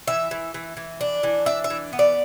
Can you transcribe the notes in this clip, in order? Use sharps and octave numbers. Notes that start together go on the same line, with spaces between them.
E3 E5
E3
E3
E3
D4
E3
D4 E5
E5
E3
B3
D5